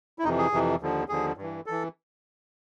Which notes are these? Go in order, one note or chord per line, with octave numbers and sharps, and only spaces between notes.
E4
F2 C3 E3 D#4
G#4
F2 C3 E3
D#2 D3 F3
D#2 D3 F3 G#4
G2 E3
E3 A4